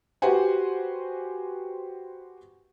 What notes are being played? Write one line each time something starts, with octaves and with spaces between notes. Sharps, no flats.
F#4 G4 B4 C5 F#5 G#5